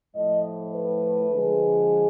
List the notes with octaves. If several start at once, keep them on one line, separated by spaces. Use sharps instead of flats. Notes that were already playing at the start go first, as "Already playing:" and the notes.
A2 F3 A3 D#5
B4
D3 F3 G#3